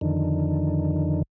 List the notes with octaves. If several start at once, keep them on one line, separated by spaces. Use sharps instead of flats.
F2 D3 D#3